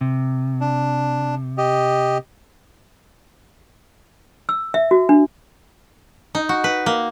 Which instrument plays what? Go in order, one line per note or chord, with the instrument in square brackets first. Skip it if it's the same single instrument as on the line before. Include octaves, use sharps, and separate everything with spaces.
[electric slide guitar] C3
[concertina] D4
G4 D#5
[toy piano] E6
E5
F#4
D4
[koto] D#4
F#4
B4
A#3